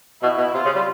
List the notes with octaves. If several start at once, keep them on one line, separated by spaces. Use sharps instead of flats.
B2 E4
B2
C3 F4
C#3
G3